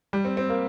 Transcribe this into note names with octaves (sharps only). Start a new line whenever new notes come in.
G3
C4
C4
A#3